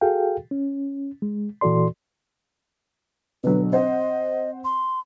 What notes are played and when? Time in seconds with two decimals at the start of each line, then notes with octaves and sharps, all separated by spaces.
0.01 F#4 G#4 A4 F5 G5
0.51 C#4
1.22 G#3
1.61 A#2 E3 F#4 A4 D5 C6
3.44 B2 D3 F#3 B4
3.72 C4 C5 D#5 F#5
4.64 C6